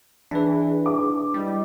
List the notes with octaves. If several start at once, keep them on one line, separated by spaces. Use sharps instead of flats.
E3 D4 G#4 B4
D6
G3 E4 D5 D#5